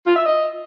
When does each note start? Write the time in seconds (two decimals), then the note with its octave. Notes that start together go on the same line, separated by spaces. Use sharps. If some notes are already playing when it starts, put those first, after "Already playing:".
0.06 F4
0.15 E5
0.24 D#5